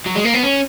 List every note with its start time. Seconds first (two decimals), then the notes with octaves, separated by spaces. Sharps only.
0.06 F#3
0.15 G#3
0.25 A#3
0.34 B3
0.43 C#4